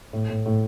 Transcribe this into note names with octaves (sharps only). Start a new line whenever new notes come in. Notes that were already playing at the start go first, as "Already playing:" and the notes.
A2
A2
A2